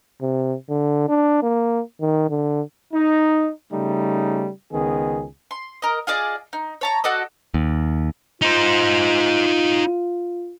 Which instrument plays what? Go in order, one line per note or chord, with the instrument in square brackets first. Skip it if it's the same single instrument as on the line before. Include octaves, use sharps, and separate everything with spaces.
[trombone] C3
D3
D4
A#3
D#3
D3
[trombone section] D#4
C#3 G3 A3 D#4
C#2 D#3 B3 G#4
[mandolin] C6
A#4 D#5
F4 G#4 D5 D#5
D#4
C#5 A5 A#5
F#4 A4 D5 D#5
[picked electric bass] D#2
[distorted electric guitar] D#4 C5 [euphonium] F4